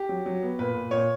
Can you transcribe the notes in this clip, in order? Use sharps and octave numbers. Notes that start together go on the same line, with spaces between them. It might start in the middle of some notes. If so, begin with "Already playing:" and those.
Already playing: G4
F#3
F#3
B3
A#2 B4
A#2
A#2 C#5